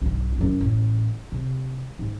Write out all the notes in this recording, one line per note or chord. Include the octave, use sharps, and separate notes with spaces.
B1 G2
F#2 E4
A1
C3
G#2